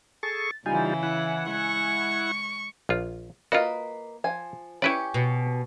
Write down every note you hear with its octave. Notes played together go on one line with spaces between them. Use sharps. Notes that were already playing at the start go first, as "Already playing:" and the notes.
G#4 A4 C#6 A6
C#3 E3 G3 D#4 F4 G#5
E4 F#5
G#3 C#6
A#1 F4
A#3 F4 F#4 B4 D#5
F3 G#5
C#4 E4 G4 B4 C#5 D5
B2